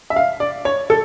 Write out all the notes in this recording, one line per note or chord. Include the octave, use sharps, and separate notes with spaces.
E5
F5
D5
C#5
A4